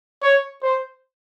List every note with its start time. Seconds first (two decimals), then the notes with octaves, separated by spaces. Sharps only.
0.22 C#5
0.62 C5